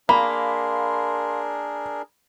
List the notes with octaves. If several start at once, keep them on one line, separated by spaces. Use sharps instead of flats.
A#3 D4 G#4 A#4 F5 B5 C6